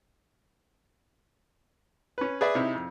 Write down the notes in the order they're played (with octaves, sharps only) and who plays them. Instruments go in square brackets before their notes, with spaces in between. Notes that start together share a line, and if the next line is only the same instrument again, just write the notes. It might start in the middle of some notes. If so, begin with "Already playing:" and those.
[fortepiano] C#4 B4
G#4 B4 D5 E5
C3 D#4 E4
F2